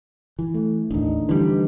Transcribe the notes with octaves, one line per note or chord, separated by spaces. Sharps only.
E3
A3
A1 D#2 D4 D#4
D3 E3 F3 G3